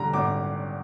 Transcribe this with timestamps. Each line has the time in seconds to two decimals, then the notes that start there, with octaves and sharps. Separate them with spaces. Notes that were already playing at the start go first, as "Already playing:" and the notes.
Already playing: D3 G3 A#5
0.14 G#1 D6